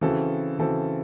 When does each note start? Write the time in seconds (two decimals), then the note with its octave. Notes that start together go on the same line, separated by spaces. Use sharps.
0.01 C#3 E3 C4 F#4 A4
0.59 C#3 E3 C4 F#4 A4